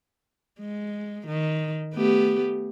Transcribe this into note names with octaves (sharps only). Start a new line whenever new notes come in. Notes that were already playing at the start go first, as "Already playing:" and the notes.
G#3
D#3
A3 B3 G4